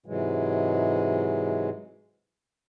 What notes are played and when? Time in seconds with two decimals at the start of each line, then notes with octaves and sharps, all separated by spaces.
0.06 G#2 C3 E3 F#3 G#3